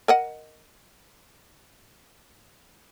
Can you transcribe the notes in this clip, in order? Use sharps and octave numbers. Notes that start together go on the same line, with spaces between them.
A#4 D#5 F#5